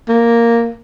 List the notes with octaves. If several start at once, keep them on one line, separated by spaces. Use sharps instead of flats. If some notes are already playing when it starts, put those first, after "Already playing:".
A#3